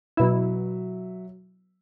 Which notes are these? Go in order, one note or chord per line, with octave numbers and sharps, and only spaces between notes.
B2 F#3 E4 E5